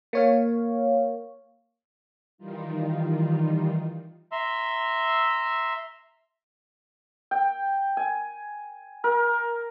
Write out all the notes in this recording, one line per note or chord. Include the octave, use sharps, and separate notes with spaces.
A#3 C#5 F5
D#3 E3 G3 D#4 F4
E5 A#5 C6 E6
G5
G#5
A#4